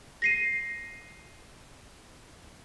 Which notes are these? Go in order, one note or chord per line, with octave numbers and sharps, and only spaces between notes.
A#6 C7 D#7